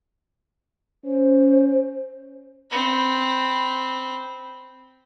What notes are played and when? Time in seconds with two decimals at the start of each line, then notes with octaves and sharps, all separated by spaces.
1.05 C#4 C5
2.71 C4 B5